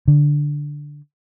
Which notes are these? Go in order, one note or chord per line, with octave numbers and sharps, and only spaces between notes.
D3